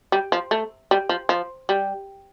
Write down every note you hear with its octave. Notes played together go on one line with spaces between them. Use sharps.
G3
F3
A3
G3
F3
F3
G3